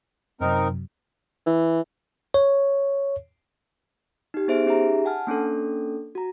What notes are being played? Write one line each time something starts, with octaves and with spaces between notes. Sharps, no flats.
F#2 C3 F#3 C4 D#4 A#4
E3
C#5
D#4 G4
B3 D#4 G#4 C5 E5 D7
C#4 D#4 G4 G#4 E5 A#5
F#5 G#5 A5 F6
A#3 C#4 D4 A4
F#4 A#5